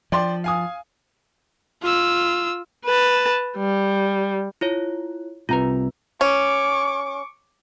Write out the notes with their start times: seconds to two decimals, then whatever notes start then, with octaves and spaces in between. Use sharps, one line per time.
0.12 F3 D5 G5 C6
0.44 F5 G#5 D#6
1.83 F4 E6
2.85 B4 A5
3.57 G3
4.61 E4 F4 C#5
5.49 C2 C3 F4 B4 A#5
6.21 C#4 C#6 D6